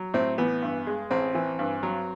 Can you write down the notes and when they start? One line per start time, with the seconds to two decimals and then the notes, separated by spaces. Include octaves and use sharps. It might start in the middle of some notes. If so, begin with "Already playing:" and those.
Already playing: F#3
0.14 A2 C4
0.38 E3 B3
0.62 G2
0.87 G#3
1.11 A1 C4
1.35 E3
1.59 G2
1.83 F#3